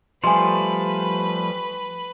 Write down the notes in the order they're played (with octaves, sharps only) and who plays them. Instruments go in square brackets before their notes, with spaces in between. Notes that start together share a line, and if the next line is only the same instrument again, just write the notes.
[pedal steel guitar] F3 G3 A3 [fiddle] B4 [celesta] G#5 C6